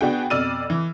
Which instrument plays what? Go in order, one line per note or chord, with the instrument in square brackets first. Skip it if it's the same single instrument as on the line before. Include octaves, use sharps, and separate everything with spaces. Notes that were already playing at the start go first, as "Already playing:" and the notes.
[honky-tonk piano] B3 D4 F#4 G#4 G5
F2 B2 D5 E6 F6 D#7
E3